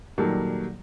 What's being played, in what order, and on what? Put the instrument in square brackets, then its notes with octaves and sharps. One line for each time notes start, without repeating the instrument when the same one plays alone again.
[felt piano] A#2 D#3 F#3 G3 A4 A#4